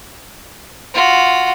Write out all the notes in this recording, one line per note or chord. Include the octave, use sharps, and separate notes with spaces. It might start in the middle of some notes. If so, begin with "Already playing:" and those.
F4 F#4